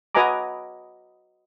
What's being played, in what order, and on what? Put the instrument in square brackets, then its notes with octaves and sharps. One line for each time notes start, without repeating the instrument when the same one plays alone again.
[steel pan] F#4 B4 D#5 G#5 A#5 D6